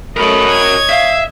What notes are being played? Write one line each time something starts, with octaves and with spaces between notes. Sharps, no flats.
A3 F#4 A#4 C#5 D#5 B5
G#6
E5 F5